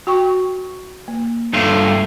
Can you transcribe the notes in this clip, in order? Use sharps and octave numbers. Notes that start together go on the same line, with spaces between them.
F#4 G5 C#6
A#3
G2 A3 F4